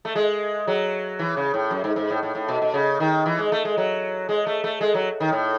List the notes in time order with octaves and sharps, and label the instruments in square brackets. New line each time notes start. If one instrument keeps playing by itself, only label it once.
[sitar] A3
G#3
F#3
E3
C#3
A2
F#2
G#2
G#2
A2
A2
A2
B2
B2
C#3
D#3
E3
G#3
A3
G#3
F#3
G#3
A3
A3
G#3
F#3
D#3
A2